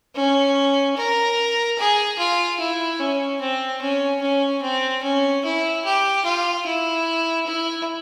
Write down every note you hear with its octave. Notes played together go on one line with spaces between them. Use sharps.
C#4
A#4
G#4
F4
E4
C#4
C4
C#4
C#4
C4
C#4
E4
G4
F4
E4
E4